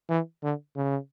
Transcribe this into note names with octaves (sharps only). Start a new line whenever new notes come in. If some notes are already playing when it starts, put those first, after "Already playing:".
E3
D3
C#3